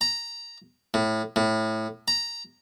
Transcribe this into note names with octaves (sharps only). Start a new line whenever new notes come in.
A#5
A2
A2
A#5